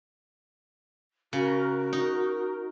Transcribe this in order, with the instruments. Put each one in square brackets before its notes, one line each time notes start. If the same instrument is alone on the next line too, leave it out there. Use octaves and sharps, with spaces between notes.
[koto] C#3 [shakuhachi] F#4 [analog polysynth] A#4
[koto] D#4